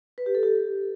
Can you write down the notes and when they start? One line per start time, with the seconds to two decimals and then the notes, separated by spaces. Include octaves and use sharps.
0.18 B4
0.26 G4
0.35 A4
0.43 G4